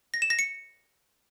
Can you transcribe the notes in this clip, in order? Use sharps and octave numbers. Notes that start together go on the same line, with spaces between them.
A#6
E7
A#6
C#7